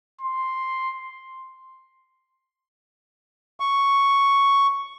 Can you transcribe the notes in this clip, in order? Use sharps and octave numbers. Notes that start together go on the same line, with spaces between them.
C6
C#6